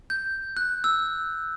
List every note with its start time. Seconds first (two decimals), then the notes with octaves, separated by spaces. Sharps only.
0.10 G6
0.57 F#6
0.84 E6